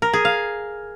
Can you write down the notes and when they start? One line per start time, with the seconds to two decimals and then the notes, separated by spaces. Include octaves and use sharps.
0.02 A#4
0.13 G#4
0.25 F5